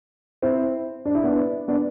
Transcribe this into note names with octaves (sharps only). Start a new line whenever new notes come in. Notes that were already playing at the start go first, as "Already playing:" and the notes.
C4 E4
D4
E4
B3 D4
B3 D4